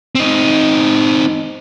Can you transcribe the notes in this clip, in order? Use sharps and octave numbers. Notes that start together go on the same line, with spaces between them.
C4 D#4